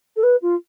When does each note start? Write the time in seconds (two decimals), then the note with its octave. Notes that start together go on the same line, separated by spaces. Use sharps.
0.16 A4
0.23 B4
0.42 F4